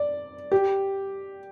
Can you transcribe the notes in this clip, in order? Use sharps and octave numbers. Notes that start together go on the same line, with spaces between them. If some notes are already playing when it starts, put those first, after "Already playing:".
Already playing: D5
G4